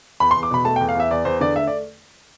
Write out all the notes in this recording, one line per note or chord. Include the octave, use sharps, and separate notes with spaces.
E2 B5
C6
E2
D6
B2 B5
A3 A5
G5
E2
F5
E2 E5
E2 D5
E2 C5
D3 D5
A3 E5
D5